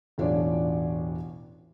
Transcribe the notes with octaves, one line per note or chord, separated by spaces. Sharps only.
E1 A1 D4 F4 C#5 D5